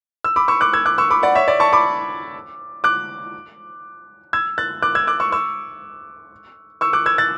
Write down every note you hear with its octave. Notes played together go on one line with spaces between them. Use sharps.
E6
B5 D6
C#6 E6
D6 F#6
E6 G#6
D6 F#6
C#6 E6
B5 D6
D5 F#5
C#5 E5
D5
A5 C#6
B5 D6
D6 F#6
E6 G#6
F#6 A6
D6 F#6
E6 G#6
D6 F#6
C#6 E6
C#6 E6
C#6 E6
D6 F#6
E6 G#6
F#6 A6